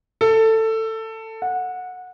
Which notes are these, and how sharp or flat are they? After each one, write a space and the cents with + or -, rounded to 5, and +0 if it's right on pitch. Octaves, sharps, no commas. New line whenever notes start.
A4 +15
F#5 -20